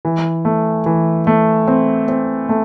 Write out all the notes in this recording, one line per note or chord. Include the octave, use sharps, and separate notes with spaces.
E3
A3
E3
A3
C4
C4
A3